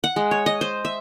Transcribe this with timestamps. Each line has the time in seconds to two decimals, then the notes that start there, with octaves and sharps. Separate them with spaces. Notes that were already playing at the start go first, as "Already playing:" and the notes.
0.04 F#5
0.16 G#3
0.31 C#5
0.46 D#5
0.61 C5
0.85 E5